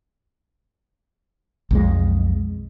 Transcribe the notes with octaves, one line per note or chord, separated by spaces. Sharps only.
B1 F2 G#3